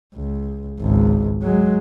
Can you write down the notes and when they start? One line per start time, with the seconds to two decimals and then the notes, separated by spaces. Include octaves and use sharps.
0.16 C#2
0.80 G#1 C#2
1.42 F#3 G#3